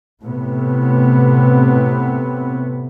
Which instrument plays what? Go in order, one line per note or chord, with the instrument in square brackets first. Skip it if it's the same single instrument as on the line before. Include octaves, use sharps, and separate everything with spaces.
[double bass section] A2 C3 B3